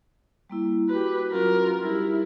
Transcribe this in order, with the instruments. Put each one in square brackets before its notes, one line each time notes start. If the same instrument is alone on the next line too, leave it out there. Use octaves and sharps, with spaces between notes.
[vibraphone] G3 A#3 E4
[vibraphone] F#4 [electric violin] G4 B4
[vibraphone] F#3 C#4 F#4 [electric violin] F4 A#4
[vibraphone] G3 D#4 G4 [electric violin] E4